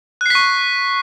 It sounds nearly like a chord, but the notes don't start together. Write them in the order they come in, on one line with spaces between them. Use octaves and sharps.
F#6 C7 B6 C#6